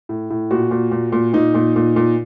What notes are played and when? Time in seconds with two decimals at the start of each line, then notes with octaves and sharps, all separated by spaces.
0.09 A2
0.30 A2
0.51 A#2 F#4
0.71 A#2
0.91 A#2
1.12 A#2
1.33 A#2 D#4
1.55 A#2
1.76 A#2
1.96 A#2